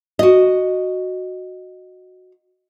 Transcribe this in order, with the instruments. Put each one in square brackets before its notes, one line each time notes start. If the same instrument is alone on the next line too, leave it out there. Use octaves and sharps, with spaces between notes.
[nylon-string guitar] F#4 D#5